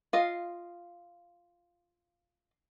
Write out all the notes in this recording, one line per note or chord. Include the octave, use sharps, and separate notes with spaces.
F4 D#5 F5